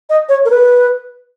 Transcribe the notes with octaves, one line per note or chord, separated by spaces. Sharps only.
D#5
C#5
A#4
B4